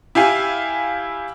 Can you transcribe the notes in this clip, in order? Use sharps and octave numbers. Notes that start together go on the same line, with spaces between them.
E4 G4 F5 G#5